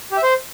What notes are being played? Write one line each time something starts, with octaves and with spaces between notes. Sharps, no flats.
G4
E5
C5